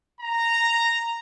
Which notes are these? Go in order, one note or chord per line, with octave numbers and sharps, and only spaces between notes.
A#5